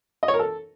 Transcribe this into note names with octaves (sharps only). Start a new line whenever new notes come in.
D#5
C#5
A#4
A4